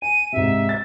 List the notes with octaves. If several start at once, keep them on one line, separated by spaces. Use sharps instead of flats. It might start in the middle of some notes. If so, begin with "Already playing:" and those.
G#5 D#7
G#2 C3 E5
A6